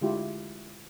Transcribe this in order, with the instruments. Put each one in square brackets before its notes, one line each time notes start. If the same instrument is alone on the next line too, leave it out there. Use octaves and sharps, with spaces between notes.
[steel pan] D3 G#3 E4 F4 G4